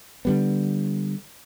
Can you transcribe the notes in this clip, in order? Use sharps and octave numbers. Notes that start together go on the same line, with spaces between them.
D3 G3 B3